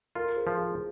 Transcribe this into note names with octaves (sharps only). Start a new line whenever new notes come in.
F4 A#4
G#4 C5
F3
G#4